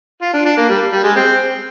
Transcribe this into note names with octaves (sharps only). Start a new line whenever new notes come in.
F4
D4
D4
A#3
G3
G3
G#3
C4